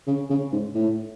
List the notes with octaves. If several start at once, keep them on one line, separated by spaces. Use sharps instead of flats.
C#3
C#3
G#2
A2